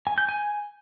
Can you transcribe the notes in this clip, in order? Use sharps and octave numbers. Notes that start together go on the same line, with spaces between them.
G#5
G6
G#5